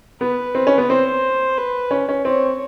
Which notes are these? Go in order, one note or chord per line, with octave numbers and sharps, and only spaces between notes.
B3 B4
C4
C#4
B3
C4 C5
B4
C#4
C#4
C4 C#5